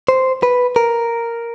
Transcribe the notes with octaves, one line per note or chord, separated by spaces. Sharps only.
C5
B4
A#4